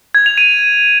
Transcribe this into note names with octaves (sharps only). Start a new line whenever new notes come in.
G#6
F7
D#7